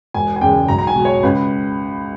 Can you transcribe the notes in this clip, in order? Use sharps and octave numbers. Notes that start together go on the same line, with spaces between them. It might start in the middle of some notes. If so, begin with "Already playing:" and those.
E1 G#5
G#5
E2 C#3 G#3 G5
B1 A#5
A#5
G#5
B2 G#3
C#5
C#2 B4